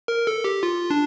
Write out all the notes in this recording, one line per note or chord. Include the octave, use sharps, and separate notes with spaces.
A#4
A4
G4
F4
D4